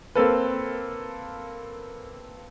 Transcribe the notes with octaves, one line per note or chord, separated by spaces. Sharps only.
A#3 C4 A4 B4